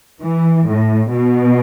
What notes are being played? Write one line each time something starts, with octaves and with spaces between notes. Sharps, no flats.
E3
A2
B2